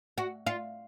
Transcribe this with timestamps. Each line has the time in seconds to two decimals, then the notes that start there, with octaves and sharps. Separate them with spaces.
0.18 F#4
0.47 F4